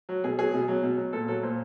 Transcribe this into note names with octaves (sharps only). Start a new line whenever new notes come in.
F#3
B2 G#4
F#3 G#4
B2
F#3
B2
F#3
A#2 A4
F#3 A4
A#2 C5